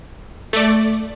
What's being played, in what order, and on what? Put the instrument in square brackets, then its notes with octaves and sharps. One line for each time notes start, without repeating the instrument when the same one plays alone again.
[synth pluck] A3 D5